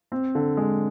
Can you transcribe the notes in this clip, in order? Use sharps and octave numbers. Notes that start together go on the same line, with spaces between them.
C4
D3
G#3